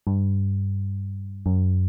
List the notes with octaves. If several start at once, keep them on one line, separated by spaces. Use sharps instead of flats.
G2
F#2